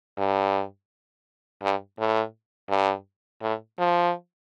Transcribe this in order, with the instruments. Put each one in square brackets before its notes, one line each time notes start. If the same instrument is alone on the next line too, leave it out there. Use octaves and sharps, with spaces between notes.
[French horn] G2
G2
A2
G2
A2
F3